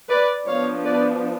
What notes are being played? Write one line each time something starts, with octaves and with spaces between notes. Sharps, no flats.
B4 D5
F3 B3 D4 C#5 F5
B4 D5